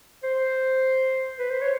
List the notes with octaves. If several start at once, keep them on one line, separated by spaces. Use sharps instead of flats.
C5
B4
C5
C#5